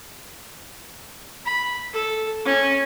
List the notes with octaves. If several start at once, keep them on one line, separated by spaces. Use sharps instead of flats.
B5
A4
C#4